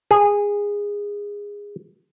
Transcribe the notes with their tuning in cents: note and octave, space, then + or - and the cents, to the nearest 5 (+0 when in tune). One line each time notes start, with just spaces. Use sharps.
G#4 -20